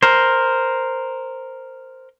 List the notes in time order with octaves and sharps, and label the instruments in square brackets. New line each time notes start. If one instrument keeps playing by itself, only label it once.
[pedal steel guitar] A#4 C5